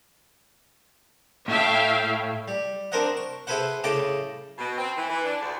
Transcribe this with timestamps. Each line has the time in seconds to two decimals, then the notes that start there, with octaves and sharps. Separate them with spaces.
1.48 A2 E5 F5 G5
2.48 G3
2.92 C4 D4 A#4 C5 D#5 F#5
3.17 C#6
3.47 E4 G#4 A4 B4 C5 F#5
3.84 A2 C#3 D#5 G5 A5 D6
4.58 B2
4.78 C4
4.97 E3
5.09 E3
5.25 D4
5.41 D2